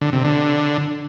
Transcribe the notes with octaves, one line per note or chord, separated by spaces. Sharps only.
D3
C3
D3